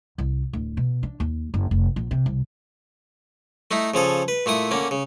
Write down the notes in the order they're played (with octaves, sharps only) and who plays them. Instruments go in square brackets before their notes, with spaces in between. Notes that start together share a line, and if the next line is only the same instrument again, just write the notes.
[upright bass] C2
D1
B2
D4
D#2
F#1
F1
A#1
C3
C2
[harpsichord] A3 D#4 E4
C#3 F3 G#4 A4
B4
A#2 A3 E4 D#6
D3 A#3 C#4
C#3